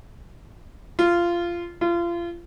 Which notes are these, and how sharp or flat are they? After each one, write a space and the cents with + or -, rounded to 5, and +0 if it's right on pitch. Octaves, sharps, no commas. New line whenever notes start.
F4 -15
F4 -30